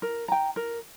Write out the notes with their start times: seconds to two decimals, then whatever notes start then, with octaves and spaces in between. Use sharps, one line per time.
0.02 A#4
0.28 G5 A#5
0.56 A#4